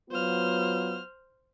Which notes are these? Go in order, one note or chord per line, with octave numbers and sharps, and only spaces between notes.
F#3 B3 F4 C5 F6